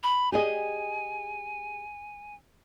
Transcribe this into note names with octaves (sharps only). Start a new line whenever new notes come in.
B5
G4 G#4 D#5 G#5